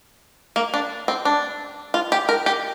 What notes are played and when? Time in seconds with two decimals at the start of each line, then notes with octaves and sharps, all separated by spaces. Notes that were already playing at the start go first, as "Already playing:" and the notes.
0.56 A#3
0.74 D4
1.08 C4
1.25 D4
1.94 F4
2.12 G4
2.29 A#4
2.46 G4